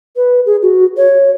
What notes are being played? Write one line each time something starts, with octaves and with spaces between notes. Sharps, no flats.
B4
G#4
F#4
C#5